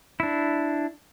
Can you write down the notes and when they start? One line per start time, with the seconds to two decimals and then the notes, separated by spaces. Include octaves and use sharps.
0.20 D4 E4